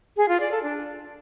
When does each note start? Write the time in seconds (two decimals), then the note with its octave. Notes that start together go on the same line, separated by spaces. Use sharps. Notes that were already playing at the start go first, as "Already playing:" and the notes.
0.17 G#4
0.29 F4
0.40 D5
0.52 A4
0.63 D4